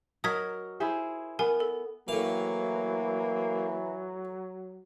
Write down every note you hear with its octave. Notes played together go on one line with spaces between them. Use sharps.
F#3 A#4 D#5 D#6 G#6 B6
E4 G#4 C5
B3 A#4 G#5
A4
A2 E3 F#3 A#3 F5